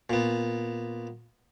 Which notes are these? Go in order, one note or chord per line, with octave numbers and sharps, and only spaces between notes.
A#2 B3